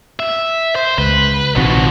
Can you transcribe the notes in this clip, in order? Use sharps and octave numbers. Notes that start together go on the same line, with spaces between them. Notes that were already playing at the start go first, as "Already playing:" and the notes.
E5
C5
C#2 B4
A#1 C3 D#3 F3 F#4